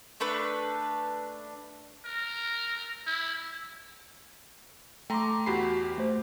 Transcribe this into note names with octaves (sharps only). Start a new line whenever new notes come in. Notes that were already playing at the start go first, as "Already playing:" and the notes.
A3 D4 B4 B5
A#4
E4
A3 G5 A#5 C6 D6
E2 F#4 G4 B5 C7
A3 C5